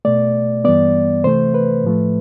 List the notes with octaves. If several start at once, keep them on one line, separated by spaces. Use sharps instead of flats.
B2 A3 D5
G2 E3 G3 B3 D5
C3 E3 A3 C5
B4
A2 F3 A3